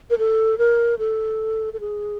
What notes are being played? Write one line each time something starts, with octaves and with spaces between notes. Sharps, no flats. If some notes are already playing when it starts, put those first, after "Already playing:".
A#4
A4
A#4
A4
A4
G#4